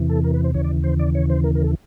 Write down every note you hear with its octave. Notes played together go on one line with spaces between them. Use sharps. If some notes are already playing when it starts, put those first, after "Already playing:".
Already playing: E2 C3 E3
A4
A#4
B4
C5
D#2 C#3 E3 C#5
D5
C5
D5
C#5
C5
A#4
A#4
A4